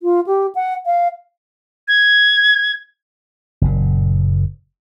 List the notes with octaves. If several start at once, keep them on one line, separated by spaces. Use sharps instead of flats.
F4
G4
F#5
F5
G#6
F#1 A#2